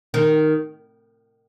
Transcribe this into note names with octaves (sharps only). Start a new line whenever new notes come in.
D#3